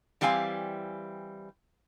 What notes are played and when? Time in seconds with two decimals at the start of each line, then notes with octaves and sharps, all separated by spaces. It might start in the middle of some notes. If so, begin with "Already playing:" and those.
0.21 E3 G3 C4 F5 G#5